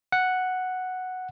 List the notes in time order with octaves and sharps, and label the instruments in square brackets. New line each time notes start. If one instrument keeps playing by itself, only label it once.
[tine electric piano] F#5